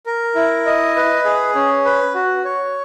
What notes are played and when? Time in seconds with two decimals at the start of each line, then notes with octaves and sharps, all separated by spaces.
0.06 A#4
0.35 E4
0.66 D#5
0.96 B4
1.25 G#4
1.55 C#4
1.85 B4
2.15 F#4
2.45 C#5